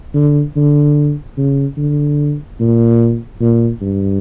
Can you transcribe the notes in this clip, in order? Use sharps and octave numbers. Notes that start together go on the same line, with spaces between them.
D3
D3
C#3
D3
A#2
A#2
G2